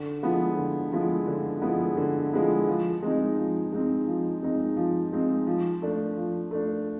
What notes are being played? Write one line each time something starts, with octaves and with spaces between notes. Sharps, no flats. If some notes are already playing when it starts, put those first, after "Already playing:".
Already playing: D3
F3 G#3 B3 E4
D3
F3 G#3 B3 E4
D3
F3 G#3 B3 E4
D3
F3 G#3 B3 E4
F3
G#3 C4 D#4
F3
G#3 C4 D#4
F3
G#3 C4 D#4
F3
G#3 C4 D#4
F3
A3 D4
F3
A3 D4